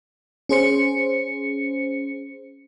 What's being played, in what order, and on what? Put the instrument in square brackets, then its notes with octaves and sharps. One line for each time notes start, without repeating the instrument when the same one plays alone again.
[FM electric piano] C#4 G#4 C5 C#7